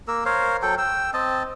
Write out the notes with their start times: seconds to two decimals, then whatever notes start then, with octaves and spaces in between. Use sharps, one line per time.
0.08 A#3 A#4 E6
0.25 A#4 C5 C#5 F5
0.62 F#3 A4 G5
0.78 G5 E6
1.14 C4 D#5 A5